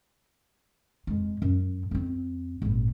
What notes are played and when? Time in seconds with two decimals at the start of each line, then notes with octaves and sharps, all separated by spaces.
1.07 F2 G#3
1.42 F#2
1.91 F2 C4
2.62 G#1 A#2